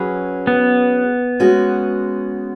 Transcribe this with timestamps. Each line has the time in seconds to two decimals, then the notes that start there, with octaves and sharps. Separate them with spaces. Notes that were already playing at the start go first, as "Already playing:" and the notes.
Already playing: F#3 C#4 G#4 B4
0.47 B3
1.40 G#3 C#4 F#4